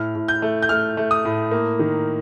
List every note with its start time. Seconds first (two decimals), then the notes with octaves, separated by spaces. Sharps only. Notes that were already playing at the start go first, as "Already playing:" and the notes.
Already playing: A2 F6
0.15 A2
0.28 G6
0.42 A3
0.63 G6
0.69 A3 F6
0.97 A3
1.11 D#6
1.25 A2
1.51 A#3
1.79 D#3